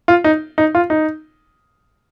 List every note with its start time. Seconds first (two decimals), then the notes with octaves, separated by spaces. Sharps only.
0.08 F4
0.24 D#4
0.58 D#4
0.75 F4
0.90 D#4